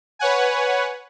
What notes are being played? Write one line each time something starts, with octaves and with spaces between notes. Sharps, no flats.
B4 C#5 F#5 G#5